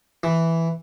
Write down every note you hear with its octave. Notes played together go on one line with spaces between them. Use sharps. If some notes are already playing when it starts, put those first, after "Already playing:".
E3